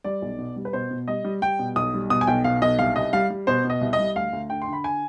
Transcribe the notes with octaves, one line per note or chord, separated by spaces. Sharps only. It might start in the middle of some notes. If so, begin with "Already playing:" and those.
G3 D5
B1
B2
G3
B4
B2 C5
B2
G3 D#5
G3
G3 G5
B2
B1 D#6
G3
B2 D#6
G#5
B1 G5
B2 F5
B1 D#5
C2 F5
C2 D#5
G3 F5
G3
B2 C5
B2
D#5
C2
D#5
G3
D2 F5
D2
D3 G5
C6
D3
B5
G#5